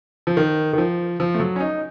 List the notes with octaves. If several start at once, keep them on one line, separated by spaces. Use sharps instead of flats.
F3
D#3
D#3
F3
F3
A3
F#3
C#4
D#4